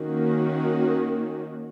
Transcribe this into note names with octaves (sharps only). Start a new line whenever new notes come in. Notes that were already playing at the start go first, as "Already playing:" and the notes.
Already playing: D#3 A#3 C#4 F#4